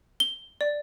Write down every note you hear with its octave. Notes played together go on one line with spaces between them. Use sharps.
G7
D5